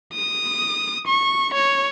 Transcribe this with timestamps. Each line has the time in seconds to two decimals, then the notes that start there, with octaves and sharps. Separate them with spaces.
0.13 D#6
1.07 C#6
1.54 C#5